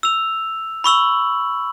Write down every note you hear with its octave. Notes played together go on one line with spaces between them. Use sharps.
E6 F7
B5 C#6 E6 F#7